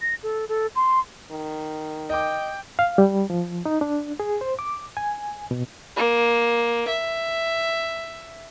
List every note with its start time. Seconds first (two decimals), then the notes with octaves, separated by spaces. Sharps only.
0.01 A#6
0.23 A4
0.49 A4
0.76 C6
1.31 D#3
2.10 D#5 G5 D6
2.79 F5
2.98 G3
3.30 F3
3.66 D#4
3.81 D4
4.20 G#4
4.41 C5
4.59 D6
4.97 G#5
5.51 B2
5.96 A#3
6.88 E5